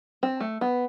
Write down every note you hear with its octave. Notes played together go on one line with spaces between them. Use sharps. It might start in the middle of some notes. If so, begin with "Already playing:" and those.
C4
A3
B3